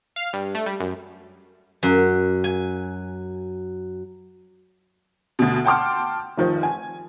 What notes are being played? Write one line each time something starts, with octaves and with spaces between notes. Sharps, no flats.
F5
G2
A3
G3
F#2
F#2
G#5
D2 B2
F#5 G5 A5 C6 D6 F6
F1 D#3 F3
G#5